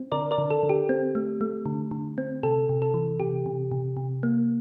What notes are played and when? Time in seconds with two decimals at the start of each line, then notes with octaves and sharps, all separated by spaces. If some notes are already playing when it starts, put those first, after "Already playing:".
Already playing: C4
0.12 D3 A#4 D5
0.31 A#4 D5
0.38 D3
0.50 A4
0.63 D3
0.69 G4
0.89 C4
1.15 A3
1.41 A3
1.66 D3
1.91 D3
2.18 C4
2.43 C3 A4
2.69 C3
2.82 A4
2.94 E3
3.20 C3 G4
3.46 C3
3.71 C3
3.97 C3
4.23 A#3